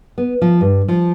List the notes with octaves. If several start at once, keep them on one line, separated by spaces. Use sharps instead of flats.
B3
F3
G2
F3